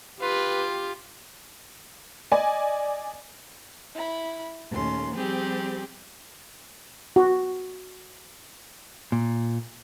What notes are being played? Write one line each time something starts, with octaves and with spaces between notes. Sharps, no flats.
F4 G4 B4
D5 D#5 G#5
E4 B5
D#2 A#2 A3 C#4 C6
F3 G3 C4 G4 G#4
F#4
A#2